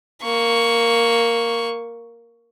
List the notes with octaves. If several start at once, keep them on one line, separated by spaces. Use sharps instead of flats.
A#3 C#6